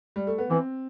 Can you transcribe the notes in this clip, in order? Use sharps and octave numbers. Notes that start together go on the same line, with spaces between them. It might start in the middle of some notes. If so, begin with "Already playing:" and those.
G3
A3
B3
E3 C4